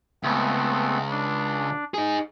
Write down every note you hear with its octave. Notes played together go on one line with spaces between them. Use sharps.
C#2 A3 B3 C4
D4
D#4 G#4